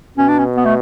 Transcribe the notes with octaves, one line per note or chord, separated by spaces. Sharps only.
B2 C#4
D4
C#4
B3
A3